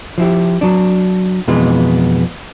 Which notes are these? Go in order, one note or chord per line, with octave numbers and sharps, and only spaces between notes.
F3 E4 G4
F#3 D4
F2 B2 E3 G#3 B3 F4